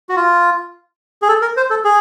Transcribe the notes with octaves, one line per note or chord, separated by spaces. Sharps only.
F#4
F4
G#4
A4
A#4
C5
A4
G#4